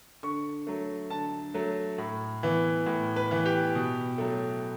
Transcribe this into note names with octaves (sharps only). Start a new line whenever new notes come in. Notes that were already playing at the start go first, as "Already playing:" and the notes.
D3 C#6
F#3 A3
D3 A5
F#3 A3
A2
E3 B3
A2
B4
E3 B3
G4
B2
F#3 A3